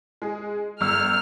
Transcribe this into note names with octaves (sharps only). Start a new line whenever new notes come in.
G#3 G#4
G1 E6 F6